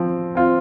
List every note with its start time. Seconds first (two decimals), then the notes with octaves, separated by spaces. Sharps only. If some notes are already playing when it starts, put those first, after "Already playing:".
Already playing: F3 C4
0.35 C4 F4